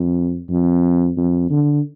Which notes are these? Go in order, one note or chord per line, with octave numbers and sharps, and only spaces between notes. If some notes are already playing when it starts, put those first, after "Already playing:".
Already playing: F2
F2
F2
D3